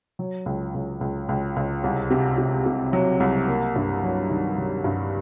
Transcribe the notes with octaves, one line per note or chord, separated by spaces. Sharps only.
F#3
C#2
C#2
C#2
C#2
C#2
C2
C3
C3
C3
F#3
C2
A#3
G2
F#3
D#3
F#3
G2